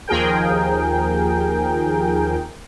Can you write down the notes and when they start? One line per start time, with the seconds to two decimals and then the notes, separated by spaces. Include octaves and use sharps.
0.08 D#2 F3 G#4 A#4 G5